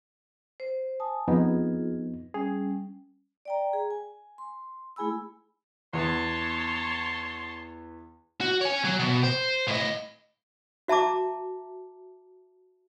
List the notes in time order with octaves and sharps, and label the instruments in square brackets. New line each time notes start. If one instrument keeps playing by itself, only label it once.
[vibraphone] C5
G#5 A5 D#6
[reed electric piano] F2 B3 D#4 [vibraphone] F4 G#4
[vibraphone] G3 C#4 [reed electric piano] G#4
[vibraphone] D5 G5 A#5
G#4
G#5
C6
A3 E4 G#4 G#5 B5 E6
[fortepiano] E2 B3 [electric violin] C#5 A5 [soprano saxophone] C6
[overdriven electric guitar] F#4
C#5 G#5
F#3
B2
C5
A2 D#5
[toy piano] F#4 E5 A5 A#5 D6